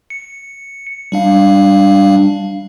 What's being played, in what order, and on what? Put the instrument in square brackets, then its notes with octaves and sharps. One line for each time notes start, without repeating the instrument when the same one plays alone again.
[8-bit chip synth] C#7
G3 D4 F5